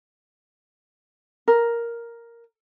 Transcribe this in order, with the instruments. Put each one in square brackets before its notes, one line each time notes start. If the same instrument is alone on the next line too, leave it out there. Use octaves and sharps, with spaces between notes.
[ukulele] A#4